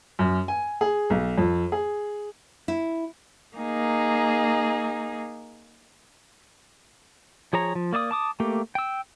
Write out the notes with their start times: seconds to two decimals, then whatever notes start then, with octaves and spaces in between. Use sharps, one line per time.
0.19 F#2
0.48 G#5
0.81 G#4
1.10 B1
1.38 F2
1.72 G#4
2.68 E4
3.57 A#3 D#4 G#4
7.53 F3 G#4 C#5 A#5
7.75 F3
7.93 A#3 D5 E5 D#6
8.11 A5 D6 D#6
8.40 A3 A#3 G4
8.75 G5 E6